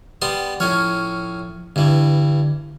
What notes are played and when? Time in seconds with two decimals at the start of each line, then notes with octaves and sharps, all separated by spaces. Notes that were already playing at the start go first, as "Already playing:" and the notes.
0.22 G3 B3 C6
0.60 A2 F3 C#4 C#5 F6
1.76 G2 D3 E3